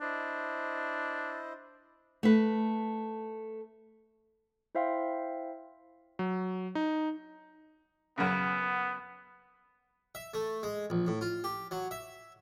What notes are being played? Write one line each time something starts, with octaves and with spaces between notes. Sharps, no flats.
D4 E4 C5 D#5
A3 B4
E4 C5 E5 F5 G5 C6
F#3
D#4
F#2 C#3 B3
E5
A3
G#3
A#1
A2
F4
G4
F#3
E5